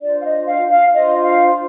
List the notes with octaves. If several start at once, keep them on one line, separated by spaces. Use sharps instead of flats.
D4 F4 C5 D5
F5
D#5
F5
F5
D4 F4 C5 D#5
F5